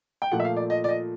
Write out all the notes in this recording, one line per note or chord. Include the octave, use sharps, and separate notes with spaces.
G5
A#2 F3 A3 F#5
E5
F5
D5
D#5
D5
D#5